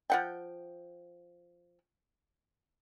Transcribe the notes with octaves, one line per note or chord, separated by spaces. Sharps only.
F3 F#5 G5